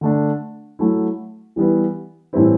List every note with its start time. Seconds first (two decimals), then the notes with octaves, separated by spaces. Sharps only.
0.01 D3 A3 D4
0.79 F#3 A3 E4
1.56 E3 G3 B3 E4
2.33 A2 E3 G3 C4 E4